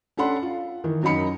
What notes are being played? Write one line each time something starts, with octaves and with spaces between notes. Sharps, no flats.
C#4 D4 A4 F#5 B5 C6
F4
D#3 E3
F#2 F#3 D#4 B5 C#7